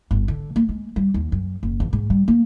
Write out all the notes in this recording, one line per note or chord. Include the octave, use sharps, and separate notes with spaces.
G1
D3
A#3
G#3
G3
D#2
F#2
F#1
E2
G#2
G3
A#3